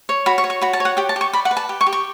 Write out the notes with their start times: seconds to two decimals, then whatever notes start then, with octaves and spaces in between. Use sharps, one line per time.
0.09 C#5
0.26 F#4 B5
0.38 C#6
0.44 C#5
0.50 C#6
0.61 F#4 B5
0.73 A5
0.80 C#5
0.85 F#5
0.97 G4 G5
1.09 A5
1.16 G4 C#6
1.33 D5 B5
1.45 F#5
1.51 B4
1.57 A5
1.69 G4
1.81 C#6
1.86 G4
1.93 C#6